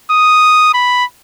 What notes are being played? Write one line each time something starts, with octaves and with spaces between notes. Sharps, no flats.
D#6
B5